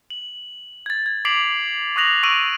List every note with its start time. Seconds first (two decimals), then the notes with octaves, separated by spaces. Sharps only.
0.10 F#7
0.86 G#6 A6
1.06 G#6
1.25 D6 B6 C7 D7 F7 F#7
1.96 C#6 D#6 F#6 A#6 F7 F#7
2.23 C#6 E6 D7 D#7 F7 F#7